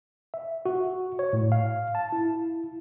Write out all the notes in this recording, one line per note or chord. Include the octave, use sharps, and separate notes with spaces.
E5
F#4
C#5
A2
F5
A5
E4